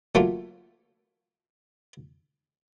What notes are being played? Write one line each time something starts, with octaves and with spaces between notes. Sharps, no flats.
F#3 A3 A#3 F4